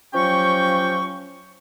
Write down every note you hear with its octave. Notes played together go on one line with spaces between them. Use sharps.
F3 F#3 C#4 G4 G5 C#6